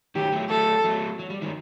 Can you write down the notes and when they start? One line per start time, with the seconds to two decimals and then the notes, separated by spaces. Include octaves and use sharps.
0.15 D#3 F#3 G4
0.32 F#3 A3
0.50 F#3 A3 A4
0.84 F#3 A3
1.19 F#3
1.30 G3
1.42 D#3 F#3